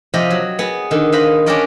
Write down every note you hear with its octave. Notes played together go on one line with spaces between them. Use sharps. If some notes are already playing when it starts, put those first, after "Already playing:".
C3 F3 G4 D#5 F5
F#3
B3 G#4
D3 D#3
B4 C5 D#5 F5 B5
C#4 D4 G4 A#4 D5 D#5